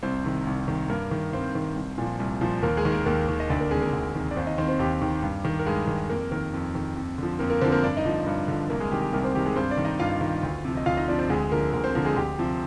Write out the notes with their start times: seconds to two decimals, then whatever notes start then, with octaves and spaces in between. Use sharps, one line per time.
0.03 C2 C4 C5
0.24 C3 D#3
0.47 C2
0.68 C3 D#3
0.89 G2 A#3 A#4
1.11 D#3
1.33 G2 C4 C5
1.55 D#3
1.76 C2
1.98 A#2 F3
2.20 C2
2.41 A#2 F3
2.62 D#2 A#3 A#4
2.77 G#3 G#4
2.85 D#3
2.92 A#3 A#4
3.06 D#2 A#3 A#4
3.29 D#3
3.40 D#5
3.50 D2 D4 D5
3.60 A#3 A#4
3.71 C3 D#3 G#3 G#4
3.82 A#3 A#4
3.93 D2
4.14 C3 D#3
4.31 D5
4.36 D#2 C4 C5
4.47 D#4 D#5
4.58 D#3 C4 C5
4.68 C4 C5
4.79 D#2 G4
5.02 D#3
5.23 G2
5.45 D#3
5.59 A#4
5.66 G2 G#3 G#4
5.87 D#3
6.09 F2 A#3 A#4
6.31 D#3 A#3 A#4
6.54 F2
6.75 D#3
6.96 F2
7.18 D3 F3
7.39 F2 A#3 A#4
7.50 A#3 A#4
7.61 D3 F3 C4 C5
7.72 A#3 A#4
7.83 G2 D4 D5
7.97 D#4 D#5
8.05 D3 F3
8.26 G2
8.48 D3 F3
8.69 C2 A#3 A#4
8.80 G#3 G#4
8.91 C3 D#3 G4
9.02 G4
9.13 C2 A#3 A#4
9.24 C4 C5
9.35 C3 D#3 G4
9.46 G#3 G#4
9.56 G2 C4 C5
9.71 D4 D5
9.78 D#3
9.85 D#4 D#5
9.99 G2 F4 F5
10.21 D#3
10.43 D2
10.65 C3 F3
10.77 D#5
10.86 D2 F4 F5
10.97 D#4 D#5
11.08 C3 F3 D4 D5
11.18 C4 C5
11.30 D2 G#3 G#4
11.51 D3 F3 A#3 A#4
11.73 D2 A#3 A#4
11.84 C4 C5
11.94 D3 F3 A#3 A#4
12.05 G#3 G#4
12.16 D2 G4
12.39 C3 F3